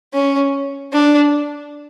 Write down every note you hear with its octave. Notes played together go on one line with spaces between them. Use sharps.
C#4
D4